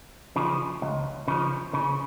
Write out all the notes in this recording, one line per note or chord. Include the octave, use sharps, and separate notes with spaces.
C#3 F3
C#2
C#3 F3
C#3